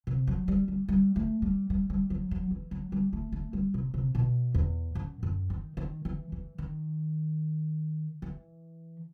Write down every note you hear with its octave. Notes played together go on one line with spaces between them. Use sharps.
C3
F#3
G3
G3
G3
A3
G3
G3
G3
F#3
F#3
E3
F#3
G3
A3
A3
G3
C3
C3
B2
E2
F#2
F#2
D#3
D#3
E3
E3
D#3
E3